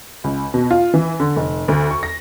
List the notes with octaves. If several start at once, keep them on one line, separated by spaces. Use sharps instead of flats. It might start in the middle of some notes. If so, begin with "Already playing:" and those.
C#2
B2
F4
E3
D3
F1
D2
C#6
A#6